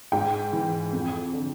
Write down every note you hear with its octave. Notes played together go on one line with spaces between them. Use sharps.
G#2 G5
E3
F2
D3